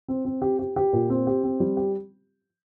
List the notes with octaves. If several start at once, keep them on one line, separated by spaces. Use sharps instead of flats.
C4
C4
G4
G4
G4
A#2
C4
G4
C4
G3
G4